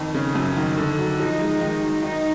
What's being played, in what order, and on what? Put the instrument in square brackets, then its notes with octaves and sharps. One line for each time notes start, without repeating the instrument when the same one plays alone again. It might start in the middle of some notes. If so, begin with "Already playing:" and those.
Already playing: [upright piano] F2 D#3
C#3
F#2
D#3
D3
F#3
[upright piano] F3 [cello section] D#4
[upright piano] G#3
D#3
F#3
[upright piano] D#3 [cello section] D#4